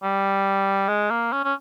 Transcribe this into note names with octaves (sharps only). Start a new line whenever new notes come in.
G3
G#3
A#3
C#4
C#4